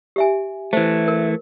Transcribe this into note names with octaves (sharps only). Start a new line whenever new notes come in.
G4 E5 G#5
E3 A3 C5
A#4